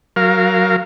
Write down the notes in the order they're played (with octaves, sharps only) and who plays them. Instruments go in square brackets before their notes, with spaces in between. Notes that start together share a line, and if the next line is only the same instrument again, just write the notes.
[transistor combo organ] F#3 A#4 F5